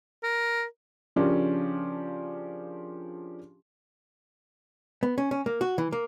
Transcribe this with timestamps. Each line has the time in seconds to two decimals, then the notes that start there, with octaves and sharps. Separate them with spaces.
0.23 A#4
1.16 C#3 F3 C#4 D4 G4 A#4
5.03 B3
5.18 C#4
5.31 C#4
5.46 A#3
5.61 F#4
5.78 E3
5.92 A#3